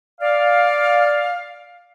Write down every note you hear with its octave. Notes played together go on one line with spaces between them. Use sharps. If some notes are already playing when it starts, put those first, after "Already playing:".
D5 F5